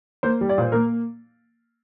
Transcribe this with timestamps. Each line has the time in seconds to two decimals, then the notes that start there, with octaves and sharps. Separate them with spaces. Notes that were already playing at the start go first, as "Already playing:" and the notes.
0.23 A#3 C5
0.41 G3
0.49 D5
0.58 A#2 C5
0.72 A#3 A#4